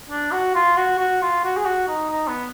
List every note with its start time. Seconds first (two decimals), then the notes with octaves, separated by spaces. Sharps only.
0.10 D4
0.32 F#4
0.55 F4
0.77 F#4
0.99 F#4
1.22 F4
1.44 F#4
1.57 G#4
1.65 F#4
1.88 D#4
2.10 D#4
2.28 B3